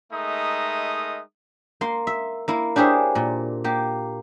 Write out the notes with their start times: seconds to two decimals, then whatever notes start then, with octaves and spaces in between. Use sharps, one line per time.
0.12 G#3 A3 D#4 A#4 E5 D#6
1.81 A#3 C6
2.07 E5
2.48 A#3 E4
2.76 D4 G4 G#4 C5 C#5 E5
3.15 A#2
3.64 A#3 G4